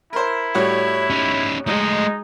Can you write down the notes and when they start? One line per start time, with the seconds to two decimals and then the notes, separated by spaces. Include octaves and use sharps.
0.13 E4 A#4 C5
0.55 A2 G3 F#4 C#5
1.10 C#4 D#4
1.67 G#3 A3 D#4 D#5